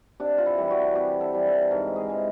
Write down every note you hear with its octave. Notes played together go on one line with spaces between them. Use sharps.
C3 D4
F4
E4
E3 G3
F#4
C3 G4
A4
E3 G3
A4
A4
G#2 A#4
G#4
E3 G#3